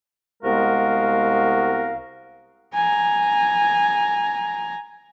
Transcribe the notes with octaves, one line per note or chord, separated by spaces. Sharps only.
C2 G#3 B3 F#4 A#4 F5
G#5 A#5